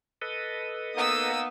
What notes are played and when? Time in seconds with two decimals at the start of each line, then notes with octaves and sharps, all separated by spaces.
0.22 A4 B4 D#5
0.95 A#3 B3 D#4 D#6 E6